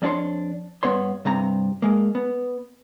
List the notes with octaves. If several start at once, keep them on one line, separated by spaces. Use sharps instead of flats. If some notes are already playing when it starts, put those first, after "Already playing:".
F2 C#4 D4 G#4 C#5 C6
G2 C3 B3 B4 C#5 C6
C2 G2 C3 A#5
G#3 A#3
B3